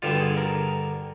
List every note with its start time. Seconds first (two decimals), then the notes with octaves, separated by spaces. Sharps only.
0.02 G2 D3 G3 F4
0.20 G#4
0.37 A#4